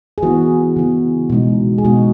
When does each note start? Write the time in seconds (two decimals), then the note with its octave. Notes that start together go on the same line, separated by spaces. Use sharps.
0.18 G#4
0.23 E3 B3 E4 F#4
0.76 C#3 E3 B3 E4
1.30 B2 G#3 D#4
1.78 G#4
1.85 B2 G#3 B3 D#4 F#4